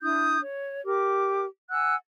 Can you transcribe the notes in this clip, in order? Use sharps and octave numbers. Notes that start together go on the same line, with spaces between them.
D4 E4 D#6 G6
C#5
G4 A#4 D6
F#5 G#5 E6 F#6